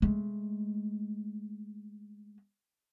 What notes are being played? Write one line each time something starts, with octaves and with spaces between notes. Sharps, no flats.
G#3 A3